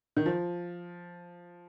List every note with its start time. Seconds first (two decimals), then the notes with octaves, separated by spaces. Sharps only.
0.17 D#3
0.26 F3